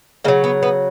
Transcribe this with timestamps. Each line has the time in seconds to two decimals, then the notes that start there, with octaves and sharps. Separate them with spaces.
0.24 C#3 A#3
0.28 F#3
0.44 B3
0.63 B3